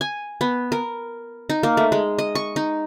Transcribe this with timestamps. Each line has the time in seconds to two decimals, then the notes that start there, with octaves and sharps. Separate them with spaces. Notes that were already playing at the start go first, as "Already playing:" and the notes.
0.01 G#5
0.41 B3
0.72 A#4
1.50 D#4
1.63 A#3
1.77 A3
1.92 G#3
2.18 D#5
2.35 C#6
2.56 D#4